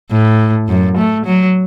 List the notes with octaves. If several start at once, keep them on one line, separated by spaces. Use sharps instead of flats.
A2
F#2
A3
F#3